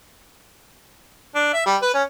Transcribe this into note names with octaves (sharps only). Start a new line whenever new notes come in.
D4
E5
G3
B4
C#4